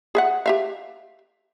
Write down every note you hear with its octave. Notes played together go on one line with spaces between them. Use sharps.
G#4 E5 F#5
G4 E5 F5